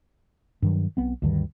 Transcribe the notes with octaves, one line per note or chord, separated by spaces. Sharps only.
G2 D#3 F#3
B1 B3 C4
D2 G2 D#3